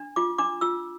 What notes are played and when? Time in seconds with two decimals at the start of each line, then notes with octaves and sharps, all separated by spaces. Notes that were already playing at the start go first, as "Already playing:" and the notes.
Already playing: D4
0.16 F4 D6
0.38 D4 D6
0.61 F4 E6